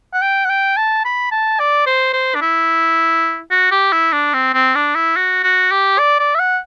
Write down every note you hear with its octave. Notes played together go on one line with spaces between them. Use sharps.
F#5
G5
F#5
G5
A5
B5
A5
D5
C5
C5
D4
E4
F#4
G4
E4
D4
C4
C4
D4
E4
F#4
F#4
G4
D5
D5
E5
F#5